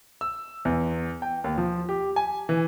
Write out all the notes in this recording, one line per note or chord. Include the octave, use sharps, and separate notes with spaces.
E6
E2
G5
D#2
F3
G4
G#5
E3